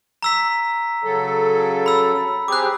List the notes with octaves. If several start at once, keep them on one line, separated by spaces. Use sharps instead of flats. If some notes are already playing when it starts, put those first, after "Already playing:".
A#5 E6 B6
C#3 F#3 A4
B5 E6
C4 G4 G#4 D6 F#6